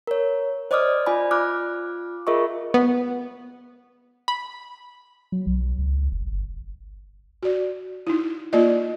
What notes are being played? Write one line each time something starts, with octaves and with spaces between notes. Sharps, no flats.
A#4 C#5
C5 D5 D#5 D6 D#6 F6
F4 D5 G#5 B5
F4 D6 F6 F#6
F4 G#4 A#4 D#5 E5 C#6
B3
B5
F#3
B1
C#2
F1
G1
F#4 D5
D#4 E4
A#3 F4 D5 D#5